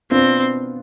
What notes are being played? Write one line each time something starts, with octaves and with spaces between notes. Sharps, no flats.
B2 B3 C4 D4 F4